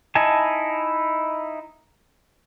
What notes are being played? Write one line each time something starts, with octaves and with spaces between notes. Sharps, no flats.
D#4 E4 D#5 G#5 A5